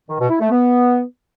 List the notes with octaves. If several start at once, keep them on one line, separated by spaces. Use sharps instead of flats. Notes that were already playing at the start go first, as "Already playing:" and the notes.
D#3
B2
E4
A3
B3